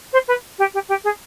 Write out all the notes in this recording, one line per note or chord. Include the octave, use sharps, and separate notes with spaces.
C5
B4
G4
G4
G4
G#4